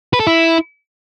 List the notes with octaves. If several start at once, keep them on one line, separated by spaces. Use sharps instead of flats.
B4
A4
E4